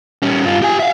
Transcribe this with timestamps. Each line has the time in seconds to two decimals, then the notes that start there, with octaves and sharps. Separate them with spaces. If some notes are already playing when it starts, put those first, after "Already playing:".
0.22 G3 C#4
0.46 G2 F4
0.62 G4 G#5
0.80 E5 F5